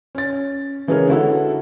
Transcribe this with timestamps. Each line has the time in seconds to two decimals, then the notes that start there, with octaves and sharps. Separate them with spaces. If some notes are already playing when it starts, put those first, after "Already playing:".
0.15 C#4 A6
0.87 C#3 E3 G#3 G#4 A#4 C#5
1.08 D3 E4 F#4 A4